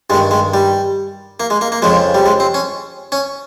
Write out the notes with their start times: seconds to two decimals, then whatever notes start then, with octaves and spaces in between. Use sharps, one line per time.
0.10 G2 G#3
0.14 D#3
0.31 G#3
0.54 G3
1.40 A#3
1.50 G#3
1.61 A#3
1.72 A#3
1.82 F2 C#3 F3 G#3
2.14 G3
2.26 G#3
2.40 C4
2.54 C#4
3.12 C#4